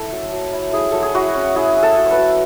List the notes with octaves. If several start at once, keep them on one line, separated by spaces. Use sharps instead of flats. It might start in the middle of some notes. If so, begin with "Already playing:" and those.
Already playing: E4 A4
F#3
F#3
E4
E4 G#4
F#3 A4
G#4
E4 F#4
C#4
E4 G#4
E4
A4
F#3
C#5
B4
F#3